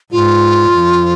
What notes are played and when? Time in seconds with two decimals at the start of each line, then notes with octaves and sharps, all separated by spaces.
0.12 G#2 F4
0.72 F2